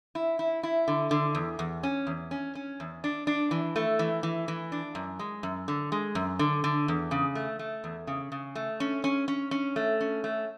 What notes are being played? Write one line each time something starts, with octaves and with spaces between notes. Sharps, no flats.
E4
E4
E4
D3
D3
E2
E2
C#4
E2
C#4
C#4
E2
D4
D4
E3
A3
E3
E3
E3
D4
F#2
G#3
F#2
D3
G#3
F#2
D3
D3
E2
C#3
A3
A3
E2
C#3
C#3
A3
C#4
C#4
C#4
C#4
A3
C#4
A3